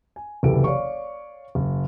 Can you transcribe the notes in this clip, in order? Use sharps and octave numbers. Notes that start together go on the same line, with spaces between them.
G#5
F#1 C2 E3 G4 A4 D7
C#5 D5 F5 C#6
F#1